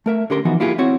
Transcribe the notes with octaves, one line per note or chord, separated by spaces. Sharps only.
A3 A#4 E5
D3 C#4 G4 A#4 C6
E3 F3 B3 D#4 F#4
A#3 E4 F4 G4 G#4
C4 E4 F#4 C#5